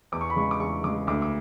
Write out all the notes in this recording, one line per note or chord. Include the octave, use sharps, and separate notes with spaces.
E2 D6
C#6
B5
C#3 G#3 C#6
D6
E2 C#6
C#3 G#3 D6
D2 D6
D6